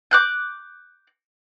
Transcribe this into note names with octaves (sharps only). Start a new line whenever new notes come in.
D6 F#6 G6